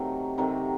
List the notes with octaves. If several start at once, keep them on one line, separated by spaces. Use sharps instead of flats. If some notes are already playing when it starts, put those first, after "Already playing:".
Already playing: C3 D#3 F#3 A3
C3 D#3 F#3 A3